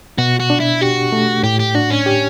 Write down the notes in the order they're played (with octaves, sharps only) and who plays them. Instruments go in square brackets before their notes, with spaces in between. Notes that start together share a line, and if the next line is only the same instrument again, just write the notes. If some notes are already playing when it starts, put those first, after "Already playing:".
[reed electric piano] B2 [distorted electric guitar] F#4
[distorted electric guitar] F#4
[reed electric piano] D4
[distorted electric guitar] E4
[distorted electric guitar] F#4 [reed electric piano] G4
[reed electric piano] A3
[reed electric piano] A2 [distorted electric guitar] G4
[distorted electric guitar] G4
[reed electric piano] D4 [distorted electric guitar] F#4
[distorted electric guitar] C#4
[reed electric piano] G4